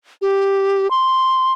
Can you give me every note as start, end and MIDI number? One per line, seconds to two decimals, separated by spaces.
0.22 0.89 67
0.90 1.52 84